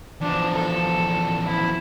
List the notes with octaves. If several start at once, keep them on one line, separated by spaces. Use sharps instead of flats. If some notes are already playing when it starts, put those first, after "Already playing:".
E2 F3 D4
A4
E4